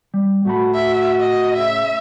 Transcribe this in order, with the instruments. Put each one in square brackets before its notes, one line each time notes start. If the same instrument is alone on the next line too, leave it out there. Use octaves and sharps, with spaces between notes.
[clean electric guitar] G3
[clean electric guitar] A2 A3 B5 [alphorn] F#4
[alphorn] F#4 [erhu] E5
[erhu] D#5
[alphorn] C#3 [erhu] E5